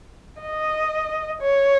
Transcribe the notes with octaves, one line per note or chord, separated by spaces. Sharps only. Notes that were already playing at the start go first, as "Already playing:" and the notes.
D#5
C#5